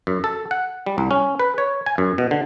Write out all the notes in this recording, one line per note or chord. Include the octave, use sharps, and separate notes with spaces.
F#2
A4
F#5
G3
C2
C#4
B4
C#5
G#5
F#2
B2
D3